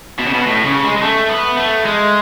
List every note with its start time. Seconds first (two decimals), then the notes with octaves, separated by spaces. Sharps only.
0.19 B2
0.27 C#3
0.34 B2
0.47 A2
0.65 C#3
0.84 G#3
0.97 G#3
1.02 A3
1.29 B3
1.57 A3
1.85 G#3